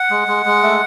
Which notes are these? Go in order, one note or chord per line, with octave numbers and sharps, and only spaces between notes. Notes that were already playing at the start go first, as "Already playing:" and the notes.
Already playing: F#5
G#3
G#3
G#3
A3